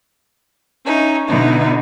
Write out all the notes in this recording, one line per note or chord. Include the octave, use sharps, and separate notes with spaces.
C#4 D#4 E5
B2 D3 B3 D#4 E4